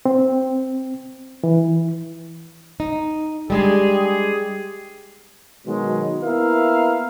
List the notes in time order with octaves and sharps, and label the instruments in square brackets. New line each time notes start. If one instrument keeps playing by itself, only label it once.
[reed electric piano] C4
E3
[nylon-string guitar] D#4
[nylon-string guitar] G3 G#3 D4 [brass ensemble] G4 G#4
[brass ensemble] B2 D#3 F#3 G#3
A#3 B3 E4 A#4 E5 F5